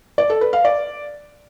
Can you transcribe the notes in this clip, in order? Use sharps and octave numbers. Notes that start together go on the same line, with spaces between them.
D5
A4
B4
F5
D5